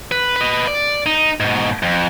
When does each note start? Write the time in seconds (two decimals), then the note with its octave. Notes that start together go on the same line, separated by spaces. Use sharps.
0.11 B4
0.36 B4 D#5
0.67 D5
1.06 D#4
1.40 G#2 B2
1.83 F2